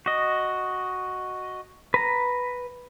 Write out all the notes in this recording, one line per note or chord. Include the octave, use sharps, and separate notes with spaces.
F#4 D#5
B4 A#5